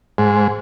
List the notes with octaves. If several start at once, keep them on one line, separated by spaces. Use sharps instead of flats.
G#2